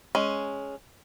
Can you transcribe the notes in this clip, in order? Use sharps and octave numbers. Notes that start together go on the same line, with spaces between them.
G#3 C#4